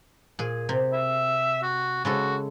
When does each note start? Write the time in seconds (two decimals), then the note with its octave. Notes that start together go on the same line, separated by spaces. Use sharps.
0.39 A#2 G#4
0.69 C3
0.93 E5
1.62 F#4
2.05 C#3 G#3 F#4 A4